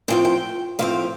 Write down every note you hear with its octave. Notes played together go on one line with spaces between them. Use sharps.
A2 F3 C4 G5
G5
A2 F3 C4 F5